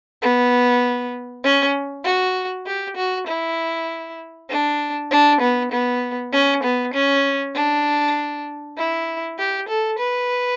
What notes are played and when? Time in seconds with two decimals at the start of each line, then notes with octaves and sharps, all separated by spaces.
0.22 B3
1.44 C#4
2.04 F#4
2.67 G4
2.97 F#4
3.28 E4
4.50 D4
5.11 D4
5.41 B3
5.72 B3
6.33 C#4
6.63 B3
6.94 C#4
7.55 D4
8.77 E4
9.38 G4
9.69 A4
9.99 B4